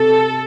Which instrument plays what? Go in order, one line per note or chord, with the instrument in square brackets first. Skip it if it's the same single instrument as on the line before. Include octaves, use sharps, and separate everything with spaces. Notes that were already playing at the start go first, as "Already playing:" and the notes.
Already playing: [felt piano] C3 C4 G4 [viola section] A4